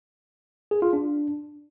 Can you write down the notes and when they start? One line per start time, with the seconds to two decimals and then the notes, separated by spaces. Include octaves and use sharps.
0.71 G#4
0.82 F4
0.93 D4